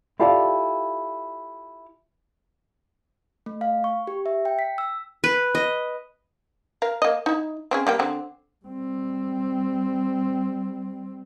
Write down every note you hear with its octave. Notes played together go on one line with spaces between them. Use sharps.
E4 F4 G4 A4 D5 F5
A3
F5
C#6
G4
E5
G5
B6
E6
B4
D#5
A#4 F5
A#3 D#5
D#4 E4
C4 C#4 G#4
G3 A#3 G5
D3 C4
G3 C4